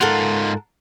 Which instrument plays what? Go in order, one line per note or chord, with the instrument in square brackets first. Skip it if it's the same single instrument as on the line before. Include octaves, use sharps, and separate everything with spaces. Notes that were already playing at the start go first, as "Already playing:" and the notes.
[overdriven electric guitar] G#2 F4 [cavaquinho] A4 A#4 F#5